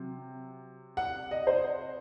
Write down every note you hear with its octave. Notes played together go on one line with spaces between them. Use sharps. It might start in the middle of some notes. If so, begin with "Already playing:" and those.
Already playing: C3 F#3
F#5
D#5
C5